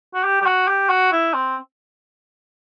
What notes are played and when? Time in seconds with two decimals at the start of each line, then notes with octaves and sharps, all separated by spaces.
0.14 F#4
0.24 G4
0.42 G4
0.46 F#4
0.68 G4
0.89 F#4
1.12 E4
1.33 C4